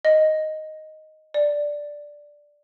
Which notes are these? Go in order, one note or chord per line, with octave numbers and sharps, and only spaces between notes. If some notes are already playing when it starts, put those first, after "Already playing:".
D#5
D5